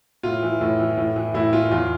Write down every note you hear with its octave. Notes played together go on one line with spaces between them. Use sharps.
A2 F4
E3
A2
E3
A2
E3
A2 E4
E3 F4
E2 F4